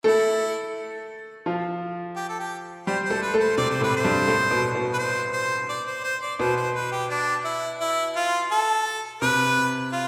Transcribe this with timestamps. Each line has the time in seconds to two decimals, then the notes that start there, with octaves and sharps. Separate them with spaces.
0.04 A3 E4 A4
1.46 F3 F4
2.16 G4
2.29 A4
2.40 G4
2.87 G3 G4 C5
3.05 C5
3.10 A3 A4
3.22 B4
3.34 A3 A4
3.40 C5
3.57 C3 C4 D5
3.70 C5
3.81 A2 A3 B4
3.97 C5
4.04 G2 G3
4.27 A2 A3
4.51 B2 B3
4.75 B2 B3
4.94 B4
4.98 C5
5.33 C5
5.69 D5
5.87 C5
6.04 C5
6.22 D5
6.39 B2 B3 C5
6.57 C5
6.75 B4
6.92 G4
7.10 D4
7.45 E4
7.81 E4
8.16 F4
8.52 A4
9.21 C3 C4 B4
9.92 F4